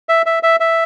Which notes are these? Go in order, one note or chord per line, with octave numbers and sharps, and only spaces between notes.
E5
E5
E5
E5